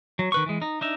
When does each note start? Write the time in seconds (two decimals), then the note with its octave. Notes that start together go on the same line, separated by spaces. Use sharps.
0.19 F#3
0.32 D#3 B4 C#6
0.46 E3 G#3
0.62 D#4
0.81 D4 D#4 E5